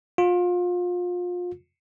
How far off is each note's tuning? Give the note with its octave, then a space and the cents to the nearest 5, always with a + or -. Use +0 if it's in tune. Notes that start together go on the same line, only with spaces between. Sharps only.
F4 +30